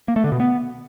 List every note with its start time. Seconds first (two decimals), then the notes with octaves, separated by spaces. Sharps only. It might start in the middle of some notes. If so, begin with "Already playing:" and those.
0.08 A#3
0.16 A3
0.24 D3
0.32 B2
0.40 B3